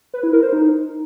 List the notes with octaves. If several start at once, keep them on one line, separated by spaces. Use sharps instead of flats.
B4
E4
A#4
C5
D#4